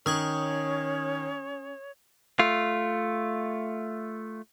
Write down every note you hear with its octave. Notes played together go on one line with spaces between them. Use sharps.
D#3 C#4 C#5 C#6 D#6 G#6
A3 F4